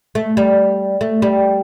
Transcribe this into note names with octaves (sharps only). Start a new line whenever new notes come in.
A3
G3
A3
G3